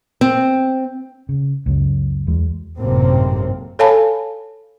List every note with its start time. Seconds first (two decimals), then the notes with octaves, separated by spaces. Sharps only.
0.21 C4
1.29 C#3
1.66 C#2 F#2
2.27 E2 G#3
2.78 G#1 F#2 A2 C3 A#3 C4
3.79 A4 C#5 F5 G#5 A5 B5